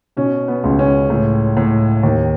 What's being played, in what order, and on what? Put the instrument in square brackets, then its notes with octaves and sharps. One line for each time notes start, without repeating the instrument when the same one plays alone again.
[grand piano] B2 C#4
B3
C#2
C#4
A2
A2
D#2